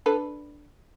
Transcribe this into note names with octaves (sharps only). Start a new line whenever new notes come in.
D4 A4 B4